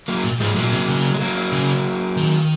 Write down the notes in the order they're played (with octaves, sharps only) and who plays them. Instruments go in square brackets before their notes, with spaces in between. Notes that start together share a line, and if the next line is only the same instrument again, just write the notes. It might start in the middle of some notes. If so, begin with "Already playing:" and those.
[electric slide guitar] F#3 A#3
[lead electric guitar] A#2
[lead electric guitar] G#2 [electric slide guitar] F3 G#3
[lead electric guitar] A#2 [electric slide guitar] F#3 A#3
[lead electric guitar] C3
C#3
[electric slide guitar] G#3
F#3 A#3
[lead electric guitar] C#3
D#3